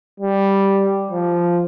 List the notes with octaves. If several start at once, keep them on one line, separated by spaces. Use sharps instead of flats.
G3
F3